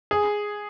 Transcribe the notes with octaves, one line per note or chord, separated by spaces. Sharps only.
G#4